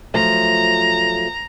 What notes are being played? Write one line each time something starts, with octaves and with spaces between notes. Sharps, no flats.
F3 F#3 A3 A#5